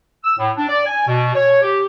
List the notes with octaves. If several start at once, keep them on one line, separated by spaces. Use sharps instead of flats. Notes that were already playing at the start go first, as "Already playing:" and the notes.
E6
A2
D4
D5
G#5
B2
C#5
G4